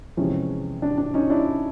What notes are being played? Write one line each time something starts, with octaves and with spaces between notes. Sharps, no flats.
E2 C3 F3 G#3 C#4
D4
D4
C#4 D#4
D4 E4